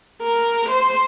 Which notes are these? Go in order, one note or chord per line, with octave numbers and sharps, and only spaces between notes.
A#4
C5